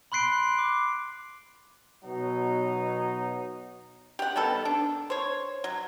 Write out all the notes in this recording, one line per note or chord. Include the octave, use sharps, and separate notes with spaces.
B5 C6 F#6 C7 D7
D6
B2 F#3 D#4
G4 F#5
D#3 G3 B3 A4
D4
C5 C#5
F#3